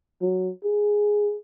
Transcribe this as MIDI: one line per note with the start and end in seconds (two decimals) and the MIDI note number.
0.21 0.50 54
0.64 1.36 68